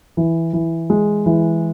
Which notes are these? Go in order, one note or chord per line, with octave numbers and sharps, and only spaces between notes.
E3
E3
G#3
E3